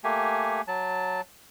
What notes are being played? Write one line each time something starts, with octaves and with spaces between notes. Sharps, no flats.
A3 A#3 G4 G#5
F#3 A5